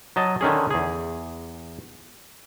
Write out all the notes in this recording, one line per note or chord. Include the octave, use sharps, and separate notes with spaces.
F#3 D#5 A5
D3 D#3 C#4 G#4
E2 G#4